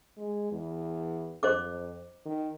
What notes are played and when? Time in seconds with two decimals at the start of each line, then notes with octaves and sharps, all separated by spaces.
0.18 G#3
0.52 E2
1.43 F2 C5 D#5 D6
2.25 D#3